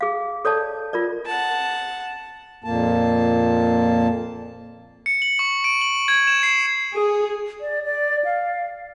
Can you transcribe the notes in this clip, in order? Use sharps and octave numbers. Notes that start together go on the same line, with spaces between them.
G#4 F5
A4 C#5 D5 A5
F4 A#4 D5
F#5 A5
F2 A#2 A#3 A5
C#7
F#7
C#6
D7
F#7
G#6
E7
C7
G#4
D5
D5
F5